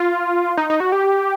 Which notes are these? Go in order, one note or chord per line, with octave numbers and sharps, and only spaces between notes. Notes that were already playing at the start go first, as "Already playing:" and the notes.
Already playing: F4
D#4
D#4
F#4
G4